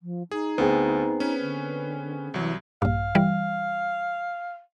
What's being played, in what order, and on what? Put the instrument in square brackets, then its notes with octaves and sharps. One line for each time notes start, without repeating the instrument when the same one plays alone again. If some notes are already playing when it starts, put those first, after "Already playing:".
[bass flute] F3
[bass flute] D#4 [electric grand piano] G#4
[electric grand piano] D2 [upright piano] B3 C4 G#4
[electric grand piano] C#4 B4
[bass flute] D3
[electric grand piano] C2 F#3 [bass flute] E3
[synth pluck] A#1 G2 [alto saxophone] F5
[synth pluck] E3 G3